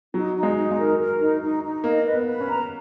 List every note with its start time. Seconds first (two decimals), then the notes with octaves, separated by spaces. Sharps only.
0.14 F#3 D#4
0.36 D#4
0.43 G#3
0.56 D#4
0.71 G#3
0.78 A#4
0.99 A#4
1.20 D#4
1.41 D#4
1.63 D#4
1.84 A#3 D#5
2.05 B4
2.12 B3
2.27 B4
2.41 C#4
2.48 A#5